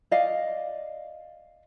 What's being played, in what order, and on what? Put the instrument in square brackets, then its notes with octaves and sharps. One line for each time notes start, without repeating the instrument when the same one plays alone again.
[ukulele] D5 D#5 F5